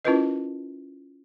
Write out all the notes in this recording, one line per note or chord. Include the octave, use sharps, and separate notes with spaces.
C#4 E4 F4 A#4 B4 D#5